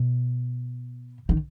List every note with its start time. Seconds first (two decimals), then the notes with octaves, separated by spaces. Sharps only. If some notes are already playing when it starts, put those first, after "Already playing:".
Already playing: B2
1.29 D#3